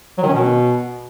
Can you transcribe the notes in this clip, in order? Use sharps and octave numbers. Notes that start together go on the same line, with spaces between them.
F#3
D#3
C#4
B2